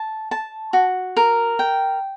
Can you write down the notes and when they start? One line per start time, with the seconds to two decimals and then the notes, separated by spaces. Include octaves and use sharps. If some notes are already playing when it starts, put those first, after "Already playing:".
Already playing: A5
0.31 A5
0.73 F#4
1.17 A#4
1.59 G5